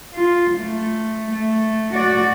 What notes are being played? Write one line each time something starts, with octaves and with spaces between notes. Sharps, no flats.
F4
A3
A3
F#4 D5